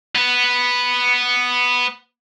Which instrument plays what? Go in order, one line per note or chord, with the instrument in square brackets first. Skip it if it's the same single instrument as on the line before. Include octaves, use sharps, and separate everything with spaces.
[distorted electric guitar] B3 B4